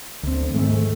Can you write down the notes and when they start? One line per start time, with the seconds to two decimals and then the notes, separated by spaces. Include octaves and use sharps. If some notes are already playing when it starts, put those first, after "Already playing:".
0.23 D2 C4
0.54 G#2 D#3 G#3 A3